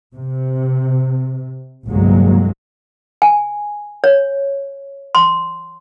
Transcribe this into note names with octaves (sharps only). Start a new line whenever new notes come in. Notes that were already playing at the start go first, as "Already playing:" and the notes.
C3
G1 C2 F#3 G#3 A#3
G#5
C#5
C6